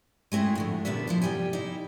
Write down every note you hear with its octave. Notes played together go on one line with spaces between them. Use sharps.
G#3 A3 C4 E4 G#4
A2 D3 F3
A#2 D3 G3 B3 B4 E5
F3 E4 C5
C3 F3 G3 G5 G#5
D#4 E4